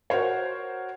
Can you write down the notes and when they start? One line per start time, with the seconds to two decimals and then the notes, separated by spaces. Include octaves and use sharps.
0.10 F#4 A#4 C5 C#5